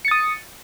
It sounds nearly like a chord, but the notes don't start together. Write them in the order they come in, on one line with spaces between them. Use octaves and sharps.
C#7 A6 D#6